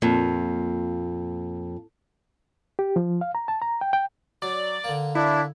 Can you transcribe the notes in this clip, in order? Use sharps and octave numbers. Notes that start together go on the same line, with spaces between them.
F2 A#2
G4
F3
F5
A#5
A5
A#5
G5
G5
F#3 D5
D3 A#3
D4 E4